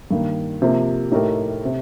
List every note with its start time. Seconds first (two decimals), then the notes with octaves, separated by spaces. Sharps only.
0.11 G2 D#3 A#3
0.62 C3 F3 A#3
1.11 A2 A3 D#4 G4 A#4
1.65 C3